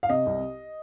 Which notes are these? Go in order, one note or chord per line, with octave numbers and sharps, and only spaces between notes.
F5
C3 D#5
C2